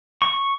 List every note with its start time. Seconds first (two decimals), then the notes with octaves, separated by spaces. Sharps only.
0.22 C#6